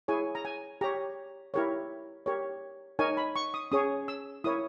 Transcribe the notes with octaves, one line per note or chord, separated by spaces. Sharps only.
E4 G#4 C#5 G#5
A#5
G#5
G4 C#5 A#5
E4 G4 A#4 C#5
G4 A#4 C#5
D#4 A#4 C#5 G#5
B5
C#6
D#6
C#4 G#4 C#5 D#6
E6
E4 A#4 C#5 D#6